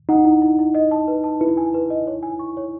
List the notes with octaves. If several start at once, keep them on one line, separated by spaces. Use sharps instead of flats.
D#4 F#5
E4
E4
E4
D#5
A5
B4
A5
E4 B4
G#5
B4
D#5
C#5
G#5
C#6
C#5